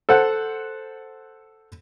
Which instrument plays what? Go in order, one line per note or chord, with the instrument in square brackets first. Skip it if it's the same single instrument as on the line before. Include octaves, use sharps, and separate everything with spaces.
[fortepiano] A4 C5 F#5